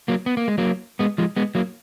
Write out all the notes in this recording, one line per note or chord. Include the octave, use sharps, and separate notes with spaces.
F#3 A#3
B3
A#3
G#3
F#3 A#3
G#3 B3
F3 G#3
G#3 B3
F#3 A#3